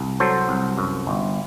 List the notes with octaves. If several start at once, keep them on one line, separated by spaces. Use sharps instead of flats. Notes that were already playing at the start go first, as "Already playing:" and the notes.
Already playing: C2
F#3 A4 C5
C2
F#2
G1